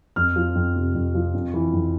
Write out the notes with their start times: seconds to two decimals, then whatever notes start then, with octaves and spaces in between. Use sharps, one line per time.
0.16 F2 F6
0.36 F3
0.55 F2
0.76 C3
0.95 F2
1.15 F3
1.34 F2
1.54 E3
1.73 F2